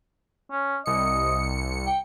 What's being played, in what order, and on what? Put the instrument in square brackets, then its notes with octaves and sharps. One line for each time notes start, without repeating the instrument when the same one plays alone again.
[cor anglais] C#4
[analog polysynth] C2 C#7 [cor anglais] D#5
[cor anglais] G5